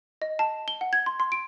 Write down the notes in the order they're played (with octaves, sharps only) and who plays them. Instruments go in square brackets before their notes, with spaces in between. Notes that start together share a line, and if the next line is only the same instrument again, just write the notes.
[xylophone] D#5
A5
G7
F#5
G#6
C6
C6
D7